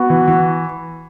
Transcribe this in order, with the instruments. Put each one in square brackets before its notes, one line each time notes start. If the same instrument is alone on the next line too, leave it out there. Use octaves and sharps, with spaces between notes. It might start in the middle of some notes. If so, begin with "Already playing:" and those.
Already playing: [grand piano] B3 [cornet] F#4
[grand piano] E3
E3